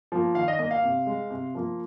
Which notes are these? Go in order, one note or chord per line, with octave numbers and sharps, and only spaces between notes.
F3 A#3
D#3 F5
D#5
A#3 D#5
F5
C3
G#3
C3
F3 A#3